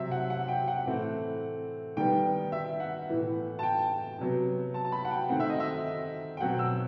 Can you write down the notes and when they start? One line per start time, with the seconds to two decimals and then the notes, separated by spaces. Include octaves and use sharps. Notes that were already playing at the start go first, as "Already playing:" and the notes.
Already playing: C3 F#3 C4 E5
0.11 F#5
0.30 F#5
0.48 G5
0.68 F#5
0.85 A2 E3 A3 C4
1.97 D#3 G3 B3 G5
2.52 E5
2.80 F#5
3.08 A2 E3 B3
3.59 A5
3.63 G5
4.19 C3 F#3 B3
4.74 A5
4.85 A5
4.92 B5
5.05 F#5
5.11 G5
5.29 D#3 A3 C4 F#5
5.40 E5
5.50 D#5
5.60 E5
6.37 G5
6.40 B2 F#3 C4 F#5
6.59 E6